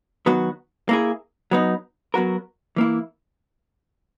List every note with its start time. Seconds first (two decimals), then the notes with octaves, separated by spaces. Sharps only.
0.26 D#3 F#3 B3 F#4
0.89 A#3 E4 G#4
1.51 F#3 B3 D#4
2.14 F#3 B3 F#4 A#4
2.76 E3 A#3 E4